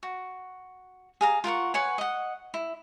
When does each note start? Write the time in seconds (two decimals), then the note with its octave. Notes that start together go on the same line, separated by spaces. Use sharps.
0.03 F#4
1.21 G#4 F5 A#5
1.44 F4 A#4 F#5 C#6
1.74 B4 C#5 F#5 G#5
1.98 D#5 F#5
2.54 E4